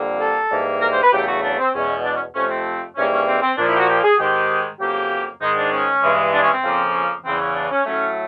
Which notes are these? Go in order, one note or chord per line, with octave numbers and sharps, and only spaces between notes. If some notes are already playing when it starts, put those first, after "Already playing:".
Already playing: F2 D3 G3 A#3
A4
G#2 E3 G3 A#3
A#4
C5
B4
E2 C#3 F#3 A3 G4
F#4
D4
C4
E2 B2 G#3 C#4
D4
C#4
F2 C3 F3 A3 C#4
C4
G#2 E3 G3 A#3 C#4
C#4
C4
C4
A#2 F3 A#3 D4
E4
G4
F#4
G4
G#4
G#2 D#3 G#3 G4
F2 C#3 F#3 A#3 G4
G#2 D#3 G#3 D#4
D4
C#4
G2 E3 G#3
D4
C#4
C4
F2 C#3 F3 A#3
C#4
E2 C#3 E3 C4
C#4
D4
C#4
A2 F#3 A3 C#4